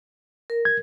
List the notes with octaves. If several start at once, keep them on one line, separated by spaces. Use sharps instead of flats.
A#4
G#6